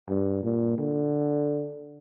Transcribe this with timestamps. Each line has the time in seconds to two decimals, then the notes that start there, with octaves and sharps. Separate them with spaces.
0.09 G2
0.43 A#2
0.78 D3